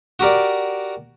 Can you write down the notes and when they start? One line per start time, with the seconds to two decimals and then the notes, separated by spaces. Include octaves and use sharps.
0.19 F#4 G4 A#4 D5